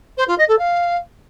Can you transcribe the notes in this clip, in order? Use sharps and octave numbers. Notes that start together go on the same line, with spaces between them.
C5
F4
D#5
A4
F5